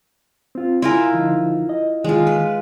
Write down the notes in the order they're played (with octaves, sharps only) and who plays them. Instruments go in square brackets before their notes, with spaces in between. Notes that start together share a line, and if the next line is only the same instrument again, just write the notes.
[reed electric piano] C4 F4
[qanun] E4 F4 A#4 [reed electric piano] G#5 C6
[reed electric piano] D3 F3 D#4
D#5
[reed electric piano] D#3 [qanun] G#3 F4
[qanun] B4